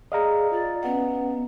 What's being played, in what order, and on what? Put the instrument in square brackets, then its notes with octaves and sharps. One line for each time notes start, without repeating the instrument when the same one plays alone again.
[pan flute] G#4 [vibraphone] D5 [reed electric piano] D#5 F5 A#5
[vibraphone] F4 [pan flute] D5
[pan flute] B3 [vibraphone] C#4 B4 F#5